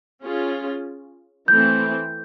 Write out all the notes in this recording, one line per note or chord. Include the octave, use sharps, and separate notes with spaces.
C#4 F4 G#4
E3 A3 C4 G6